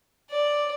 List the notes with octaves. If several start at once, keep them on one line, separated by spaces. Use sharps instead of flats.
D5